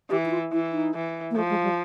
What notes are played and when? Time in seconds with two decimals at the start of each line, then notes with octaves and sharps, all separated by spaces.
0.10 E3 G4
0.25 E4
0.31 F4
0.53 E3 E4
0.72 D#4
0.94 E3
1.31 A#3
1.35 F3 A3
1.50 G#3
1.63 G3